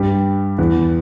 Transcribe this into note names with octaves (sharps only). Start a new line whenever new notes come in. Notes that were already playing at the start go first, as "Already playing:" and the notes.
Already playing: G2 G3
E2 E3